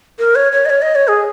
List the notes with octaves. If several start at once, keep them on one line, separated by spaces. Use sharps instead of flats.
A#4
C#5
C#5
D#5
C#5
D#5
C#5
G#4